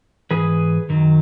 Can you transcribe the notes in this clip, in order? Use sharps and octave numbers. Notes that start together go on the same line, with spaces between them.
G#2 E3 G#4 B4
F#2 D#3 F#3